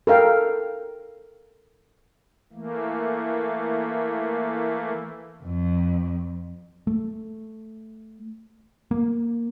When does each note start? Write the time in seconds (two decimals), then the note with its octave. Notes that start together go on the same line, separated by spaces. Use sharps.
0.07 A4 A#4 F5 G5
2.53 E3 A3 A#3
5.43 F2
6.87 A3
8.91 A#3